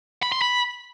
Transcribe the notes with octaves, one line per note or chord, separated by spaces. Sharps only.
B5
C6
B5